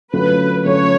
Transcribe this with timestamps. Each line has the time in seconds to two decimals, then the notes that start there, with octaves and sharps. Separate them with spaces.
0.13 D3 F#3 A3 C#4 F4 B4
0.65 D3 F#3 A3 C#4 F4 C#5